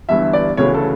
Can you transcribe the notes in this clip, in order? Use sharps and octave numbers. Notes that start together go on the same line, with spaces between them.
G1 G2 E3 E5
D5
D2 C#3 E3 A3 C#5
A4